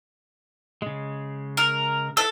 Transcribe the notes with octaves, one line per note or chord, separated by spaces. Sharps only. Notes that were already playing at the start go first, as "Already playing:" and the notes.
C#3 G#3
A#4
E4 A4 B4 E6